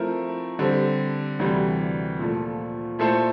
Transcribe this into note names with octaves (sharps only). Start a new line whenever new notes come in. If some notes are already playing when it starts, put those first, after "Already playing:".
Already playing: F3 A3 C4 E4 A#4
D3 G3 C4
D2 C3 E3 G3
A#2 F3 A3
A#2 A3 E4 A4 C5